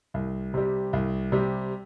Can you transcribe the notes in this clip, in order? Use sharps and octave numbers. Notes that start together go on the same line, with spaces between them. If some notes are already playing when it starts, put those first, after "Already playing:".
C2
C3 G3
C2
C3 G3